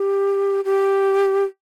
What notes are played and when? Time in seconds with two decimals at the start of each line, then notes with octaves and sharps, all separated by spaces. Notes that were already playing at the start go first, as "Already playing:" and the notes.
Already playing: G4
0.65 G4